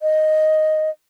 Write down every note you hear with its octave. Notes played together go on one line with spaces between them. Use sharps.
D#5